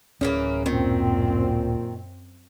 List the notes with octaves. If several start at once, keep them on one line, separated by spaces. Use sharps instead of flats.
D1 C#3 E3 A#3 C#4
F#2 A#2 D#3 C4